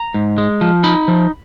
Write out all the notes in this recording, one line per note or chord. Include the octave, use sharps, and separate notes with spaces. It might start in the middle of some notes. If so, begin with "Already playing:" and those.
Already playing: A#5
G#2
G#3
F3
D#4 B5
F3